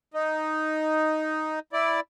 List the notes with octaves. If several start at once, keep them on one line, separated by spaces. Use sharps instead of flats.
D#4
E4 D5